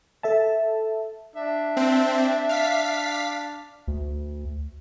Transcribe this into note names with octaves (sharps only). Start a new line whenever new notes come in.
A4 E5 A5
D4 E5
C4
F5 B6
D2